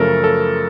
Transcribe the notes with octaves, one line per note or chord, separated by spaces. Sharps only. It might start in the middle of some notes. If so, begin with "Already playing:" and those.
Already playing: F#2 C#3 F3 A3 A4 A#4
A4